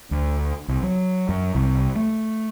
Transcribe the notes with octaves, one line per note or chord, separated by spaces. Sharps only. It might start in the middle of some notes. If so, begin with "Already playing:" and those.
D2
C2
F#3
F#2
C2
A3